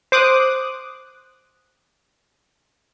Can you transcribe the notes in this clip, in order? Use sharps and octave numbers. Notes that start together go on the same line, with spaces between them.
C5 D6 D#6 F#6